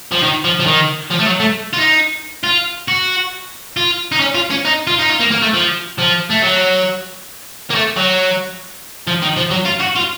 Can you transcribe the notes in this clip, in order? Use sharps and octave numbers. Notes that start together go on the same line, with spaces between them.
F3
D#3
F3
F3
D#3
F3
A3
F#3
A3
F4
D#4
F4
F#4
F4
D#4
C#4
F4
C#4
D#4
F4
D#4
F4
A#3
A#3
A3
F3
F3
A3
F#3
A#3
A3
F#3
F3
D#3
F3
F#3
F4
F#4
F4